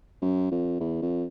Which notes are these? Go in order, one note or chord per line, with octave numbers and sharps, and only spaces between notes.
F#2
F2
E2
F2